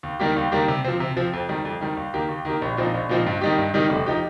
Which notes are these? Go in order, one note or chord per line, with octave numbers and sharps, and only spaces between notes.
D#2
D#3 G3 A#3 G4
D#2
D#3 G3 A#3 G4
C3
F3 C4
C3
F3 C4
F2
D#3 G3
F2
D#3 G3
D#2
D#3 A#3 G4
D#2
D#3 A#3 G4
A#1
A#2 F3 C4 D#4
A#1
A#2 F3 C4 D#4
G2
D#3 G3 D#4 G4
G2
D#3 G3 D#4 G4
F1
F3 D#4 G4